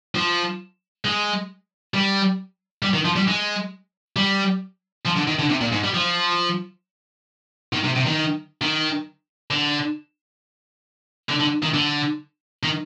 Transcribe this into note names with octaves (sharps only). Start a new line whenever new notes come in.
F3
G#3
G3
G3
D#3
F3
G3
G#3
G3
F3
D3
D#3
D3
C3
A#2
G#2
G3
F3
D#3
C3
C3
D#3
D#3
D3
D3
D3
D#3
D3
D#3